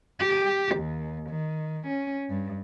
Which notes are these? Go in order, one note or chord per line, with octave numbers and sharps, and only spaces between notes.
G4
D#2
D#3
C#4
G2